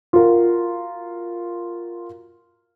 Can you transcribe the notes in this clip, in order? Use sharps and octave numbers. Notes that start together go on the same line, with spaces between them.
F4 F#4 A#4